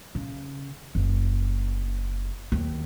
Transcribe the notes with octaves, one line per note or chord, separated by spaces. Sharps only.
C#3
F#1
D#2